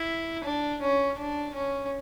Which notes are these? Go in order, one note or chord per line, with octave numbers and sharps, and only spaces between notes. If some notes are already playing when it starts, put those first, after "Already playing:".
Already playing: E4
D4
C#4
D4
C#4